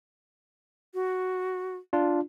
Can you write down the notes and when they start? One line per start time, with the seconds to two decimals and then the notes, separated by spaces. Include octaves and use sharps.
0.94 F#4
1.93 D4 F4